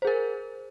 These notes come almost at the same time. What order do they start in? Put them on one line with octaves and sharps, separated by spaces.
C5 G#4 A#4